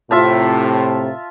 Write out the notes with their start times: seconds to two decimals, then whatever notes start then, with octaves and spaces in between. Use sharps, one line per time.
0.11 A2 C3 F4 E5 A5